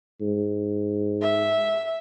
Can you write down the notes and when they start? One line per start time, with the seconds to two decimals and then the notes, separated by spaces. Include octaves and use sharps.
0.21 G#2
1.21 E5